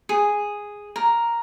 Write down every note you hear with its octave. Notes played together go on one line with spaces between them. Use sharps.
G#4
A#4